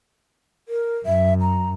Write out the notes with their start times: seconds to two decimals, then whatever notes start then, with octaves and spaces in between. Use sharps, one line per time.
0.69 A#4
1.06 F#2 E5
1.41 A#5